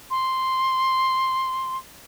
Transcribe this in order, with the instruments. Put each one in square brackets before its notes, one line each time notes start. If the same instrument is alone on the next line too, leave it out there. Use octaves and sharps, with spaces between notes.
[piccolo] C6